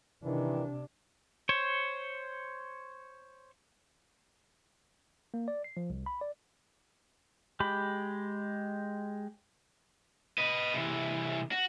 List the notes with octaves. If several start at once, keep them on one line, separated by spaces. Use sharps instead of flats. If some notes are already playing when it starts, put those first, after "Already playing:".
C3 D#3 E3 D4
C5 C#5
A#3
D5
C7
F3
C2
B5
D5
G#3 G4 B5
B4 D#5
C3 E3
F#4